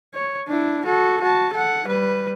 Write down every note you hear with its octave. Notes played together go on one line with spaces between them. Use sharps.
C#5
D4 E4
F#4 A4
F#4 A5
A4 F#5
G3 B4